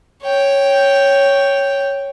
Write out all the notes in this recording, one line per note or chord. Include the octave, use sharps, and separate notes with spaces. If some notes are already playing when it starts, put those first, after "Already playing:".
C#5 G5